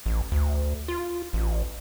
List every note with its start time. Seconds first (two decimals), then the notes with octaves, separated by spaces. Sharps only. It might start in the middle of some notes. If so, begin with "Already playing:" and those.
0.06 A1
0.32 D2
0.88 F4
1.33 A1